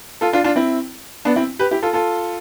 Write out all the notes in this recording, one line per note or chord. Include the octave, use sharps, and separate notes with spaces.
F4 A4
D4 F4
D4 F4
C4 E4
B3 D4
C4 E4
G4 B4
E4 G4
F4 A4
F4 A4